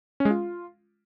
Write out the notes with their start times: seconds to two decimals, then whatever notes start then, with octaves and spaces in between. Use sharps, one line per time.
0.20 C#4
0.25 G#3
0.30 F4